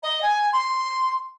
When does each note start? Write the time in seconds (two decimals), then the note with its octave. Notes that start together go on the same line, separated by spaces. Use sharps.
0.03 D#5
0.22 G#5
0.52 C6